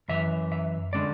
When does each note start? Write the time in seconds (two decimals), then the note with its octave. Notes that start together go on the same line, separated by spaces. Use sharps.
0.08 F#2 E3 E5
0.52 E5
0.93 D3 G#3 D4 D5